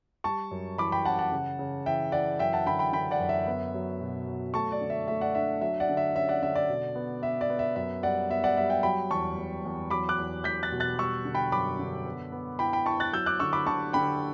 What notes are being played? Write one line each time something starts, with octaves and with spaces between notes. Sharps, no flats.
G3 A5 C#6
F#2
E3 B5 D6
G5 B5
C#4 F#5 A5
F#5 A5
C#3
C#3
E3 E5 G5
E3 D5 F#5
F#2 E5 G5
F#5 A5
D3 G5 B5
G5 B5
D3 G5 B5
D5 F#5
F#2
E5
B3
F#3
B2
F#3
A3 A5 C#6
D5
D3
E5
A3 E5
D5 F#5
D4 E5
F#3 E5
D5 F#5
D3
E5
C#4 E5
D5 F#5
D3 E5
D5
B2
B3
B3 E5
D5
B3
E5
F#2 E5
G3 D5 F#5
B3 E5
D5 F#5
G3 E5
E5 G5
F#3 G5 B5
E2 A5 C#6
E2
E2
F#3 B5 D6
D6 F#6
E2
E2 G6 B6
F#6 A6
B2
F#6 A6
G3 C#6 E6
D3
G5 B5
F#2 B5 D6
D3
B3
B3
E4 G5 B5
G5 B5
E4 A5 C#6
F#6 A6
F#3 E6 G6
D6 F#6
D3 C#6 E6
B5 D6
D3 A5 C#6
D3 G5 B5